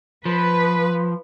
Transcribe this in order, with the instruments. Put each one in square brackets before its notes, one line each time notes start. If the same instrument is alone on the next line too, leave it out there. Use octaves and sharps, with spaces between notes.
[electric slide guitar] F3 [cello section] B4